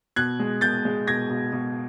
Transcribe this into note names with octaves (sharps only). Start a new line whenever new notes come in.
B2 F#6 G#6
G#3
B2 G6 A6
G#3
B2 G#6 A#6
B2
B2